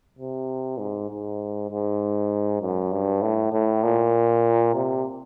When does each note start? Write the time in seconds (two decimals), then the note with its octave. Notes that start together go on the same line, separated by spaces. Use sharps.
0.18 C3
0.79 G#2
1.09 G#2
1.71 G#2
2.62 F#2
2.92 G2
3.22 A2
3.53 A2
3.84 A#2
4.74 C3